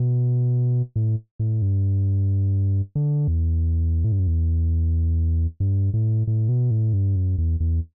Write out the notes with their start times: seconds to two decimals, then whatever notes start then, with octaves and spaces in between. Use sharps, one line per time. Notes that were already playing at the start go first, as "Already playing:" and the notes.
Already playing: B2
0.96 A2
1.39 A2
1.62 G2
2.95 D3
3.28 E2
4.04 A2
4.12 G2
4.19 F#2
4.27 E2
5.60 G2
5.94 A2
6.27 A2
6.49 B2
6.71 A2
6.93 G2
7.16 F#2
7.38 E2
7.60 E2